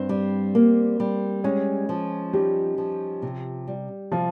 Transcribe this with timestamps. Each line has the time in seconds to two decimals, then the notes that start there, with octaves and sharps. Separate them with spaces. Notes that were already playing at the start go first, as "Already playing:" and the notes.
Already playing: G2 C4 C5
0.09 G3
0.55 A#3
1.00 G3
1.44 G#3 C#4 C#5
1.89 F3
2.33 G3 D#4 G4
2.78 F3
3.22 C3
3.68 G3
4.12 C3 F3 F4